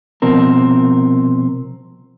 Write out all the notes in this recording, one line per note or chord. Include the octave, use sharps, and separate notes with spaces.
C2 B2 F3 C4 A#4